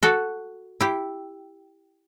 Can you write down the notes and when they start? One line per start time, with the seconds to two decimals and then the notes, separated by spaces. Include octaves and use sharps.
0.03 F#4 A4
0.81 E4 G4